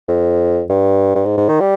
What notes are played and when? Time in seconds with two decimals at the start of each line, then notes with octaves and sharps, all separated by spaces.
0.09 F2
0.70 G2
1.15 G2
1.26 G#2
1.37 G#2
1.49 D#3
1.61 G3